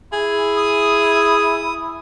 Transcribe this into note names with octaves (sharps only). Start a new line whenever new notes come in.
E4 G#4
D#6